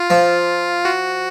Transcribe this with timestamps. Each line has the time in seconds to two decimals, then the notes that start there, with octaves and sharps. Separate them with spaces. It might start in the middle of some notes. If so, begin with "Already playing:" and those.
Already playing: F4
0.10 F3
0.85 F#4